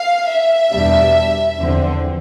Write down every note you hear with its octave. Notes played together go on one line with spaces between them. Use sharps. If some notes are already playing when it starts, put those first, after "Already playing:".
Already playing: F5
E5
E2 B2 G3 D4
E2 D3 F3 C4